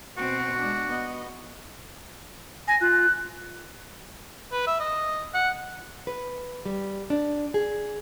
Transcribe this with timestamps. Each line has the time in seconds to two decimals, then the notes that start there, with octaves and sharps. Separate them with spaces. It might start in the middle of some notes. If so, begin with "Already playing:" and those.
0.17 B2 C4 F#4
0.59 G#3 D4
0.90 B3 D#5
2.68 G#5 A#6
2.81 F4 F#6
4.52 B4
4.67 E5
4.80 D#5
5.34 F#5
6.07 B4
6.66 G3
7.10 D4
7.54 G#4